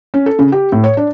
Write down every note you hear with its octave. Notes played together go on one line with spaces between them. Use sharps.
C#4
A4
C#3
G4
A2
C#5
D4